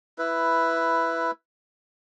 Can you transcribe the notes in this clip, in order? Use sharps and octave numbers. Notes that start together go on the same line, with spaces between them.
E4 B4